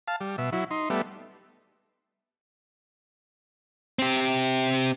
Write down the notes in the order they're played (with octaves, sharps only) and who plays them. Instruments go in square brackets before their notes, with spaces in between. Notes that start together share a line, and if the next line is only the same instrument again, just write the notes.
[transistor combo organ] F5 A5
G3
B2 E5
F#3 E4
D#4 C6
G3 A3 B3 E5
[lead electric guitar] C4 G4